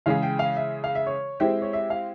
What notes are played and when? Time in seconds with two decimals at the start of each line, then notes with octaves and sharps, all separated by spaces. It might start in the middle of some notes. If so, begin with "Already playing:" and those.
0.06 C#3 E3 G#3 E4 G#4 F5
0.23 G5
0.39 F5
0.57 E5
0.84 F5
0.95 E5
1.06 C#5
1.40 G#3 C4 E4 G4 E5
1.62 C#5
1.73 E5
1.90 F5